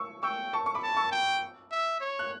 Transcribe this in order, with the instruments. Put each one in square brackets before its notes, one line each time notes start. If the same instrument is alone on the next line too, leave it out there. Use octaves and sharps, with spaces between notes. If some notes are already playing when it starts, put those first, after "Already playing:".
Already playing: [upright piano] C#6 E6
[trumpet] G5 [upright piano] C#6 E6
[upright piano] A5 C#6
C#6
B5 D6
[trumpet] A5
[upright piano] C#6 E6
[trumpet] G5
E5
C#5
[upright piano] F#6